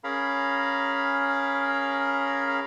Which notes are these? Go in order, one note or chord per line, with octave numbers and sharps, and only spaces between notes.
C#4 G#4 A#4 F5 A#5 B5